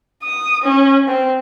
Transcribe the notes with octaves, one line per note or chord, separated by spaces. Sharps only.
D#6
C#4
C4